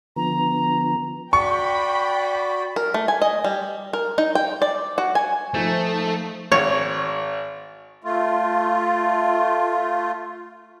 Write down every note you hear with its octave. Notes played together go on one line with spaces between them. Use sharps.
D3 F3 B3 A#5
F#4 D5 G5 B5 C#6
A#4
A3
G#5
D#5
G3
A#4
D#4
G5
D5
F#4
G#5
F3 A3 D#4 C5
G#1 C#5
A3 F4